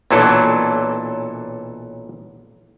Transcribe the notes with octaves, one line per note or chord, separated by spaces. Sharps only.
B1 A#2 E3 F#3 D4 A4